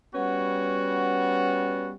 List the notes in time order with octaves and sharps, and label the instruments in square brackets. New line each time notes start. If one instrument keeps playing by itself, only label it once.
[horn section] G3 B3 C#4 F#4